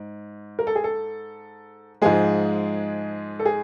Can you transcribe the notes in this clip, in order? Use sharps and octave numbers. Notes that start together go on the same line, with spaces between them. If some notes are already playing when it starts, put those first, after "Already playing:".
Already playing: G#2
A#4
A4
G#4
A4
G#2 F3 G#3 G#4
A4
G#4